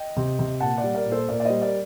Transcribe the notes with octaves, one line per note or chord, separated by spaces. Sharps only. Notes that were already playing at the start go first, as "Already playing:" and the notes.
Already playing: D#5 G5
C3
C3
A#2 F#5 A5
D5 F#5
G3
A#4 D5
A#2
A4 C5
A#2 A#4 D5
D5
G3 C5 D#5
A#4 D5